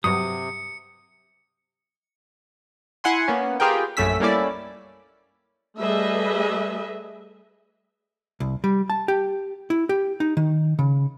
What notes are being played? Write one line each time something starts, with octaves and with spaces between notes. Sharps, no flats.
G2 C3 F#3 D#6 C#7
E4 F#5 G#5 C6
A#3 B3 C#4
F4 G4 G#4 A#4 B4 G5
A#1 F#2 A3 C#4 E6 B6
G3 A3 A#3 C#4 E4 D5
G3 A3 G#4 B4 D#5 E5
C2
G3
A5
G4
E4
G4
D#4
D#3
C#3